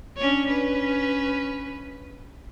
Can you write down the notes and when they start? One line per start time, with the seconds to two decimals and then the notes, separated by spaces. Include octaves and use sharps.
0.17 C#4 D4 C#5
0.47 C#4 B4